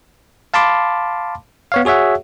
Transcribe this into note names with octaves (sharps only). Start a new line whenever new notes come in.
F5 A5 B5 C6 D6
B3 C#5 F5
F#4 G#4 C#5 E5 F#5